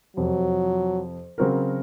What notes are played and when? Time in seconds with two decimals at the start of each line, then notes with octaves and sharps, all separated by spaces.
0.16 F2 C3 F3 F#3
1.38 C#3 F#3 C4 F#4 A#4